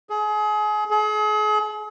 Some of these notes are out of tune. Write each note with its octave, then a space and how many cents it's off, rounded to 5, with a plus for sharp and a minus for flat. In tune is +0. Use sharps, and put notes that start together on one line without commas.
G#4 +30
G#4 +40